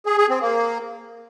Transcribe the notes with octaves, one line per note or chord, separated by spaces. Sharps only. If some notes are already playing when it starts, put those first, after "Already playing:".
G#4
G#4
C4
A#3